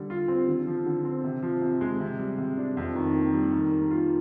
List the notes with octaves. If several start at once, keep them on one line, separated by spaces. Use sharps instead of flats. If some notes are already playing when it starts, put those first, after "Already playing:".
Already playing: D3 G3
F4
C4
D3
F3
D3
C4
C3
F3
C3
G#3
C3
G3
C3
D4
F2
D#3
A#3
G3
D#3
A#3
F4